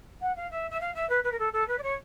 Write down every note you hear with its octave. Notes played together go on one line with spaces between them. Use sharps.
F#5
F5
E5
E5
F5
E5
B4
B4
A#4
A4
A4
B4
D5
C#5